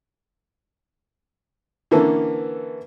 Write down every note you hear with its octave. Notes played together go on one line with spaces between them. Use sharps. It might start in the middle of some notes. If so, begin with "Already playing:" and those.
D3 E3 A#3 C#4 A4